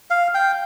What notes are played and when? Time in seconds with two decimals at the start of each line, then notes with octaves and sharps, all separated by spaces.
0.10 F5
0.34 G5